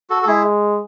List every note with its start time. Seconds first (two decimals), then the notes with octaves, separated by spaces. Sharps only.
0.10 F#4 A4
0.23 A4
0.27 G#3 E4 G#4